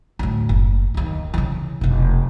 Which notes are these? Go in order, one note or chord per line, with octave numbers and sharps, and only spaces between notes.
D2 A2
F#1
D#2 D3
C#3 E3
F1 B2